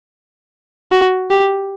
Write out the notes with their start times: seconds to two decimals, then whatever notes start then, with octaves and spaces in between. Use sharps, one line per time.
0.92 F#4
1.30 G4